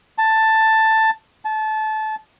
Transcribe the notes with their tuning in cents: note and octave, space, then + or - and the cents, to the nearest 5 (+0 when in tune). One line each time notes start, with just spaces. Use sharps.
A5 +10
A5 -25